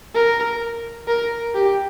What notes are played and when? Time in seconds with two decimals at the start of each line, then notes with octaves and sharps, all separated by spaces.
0.15 A#4
1.07 A#4
1.54 G4